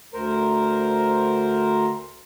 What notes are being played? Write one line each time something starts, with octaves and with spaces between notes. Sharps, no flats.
D2 A#4 C5